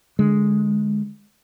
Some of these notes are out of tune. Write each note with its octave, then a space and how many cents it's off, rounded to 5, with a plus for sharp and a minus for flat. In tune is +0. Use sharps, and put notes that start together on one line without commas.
D3 +0 G#3 +0